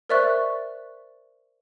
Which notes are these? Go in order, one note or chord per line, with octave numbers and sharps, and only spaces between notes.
A#4 C5 D5 E5 C#6 F#6